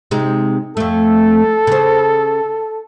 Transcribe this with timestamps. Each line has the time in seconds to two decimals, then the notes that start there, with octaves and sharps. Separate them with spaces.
0.11 C3 G#3 D#4
0.77 F2 A3 A4
1.67 C#3 C5